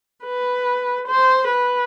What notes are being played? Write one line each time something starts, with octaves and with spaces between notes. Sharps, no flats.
B4
C5
B4